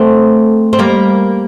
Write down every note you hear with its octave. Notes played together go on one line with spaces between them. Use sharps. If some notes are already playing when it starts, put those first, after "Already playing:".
Already playing: A3 C4
C4
G3 A#3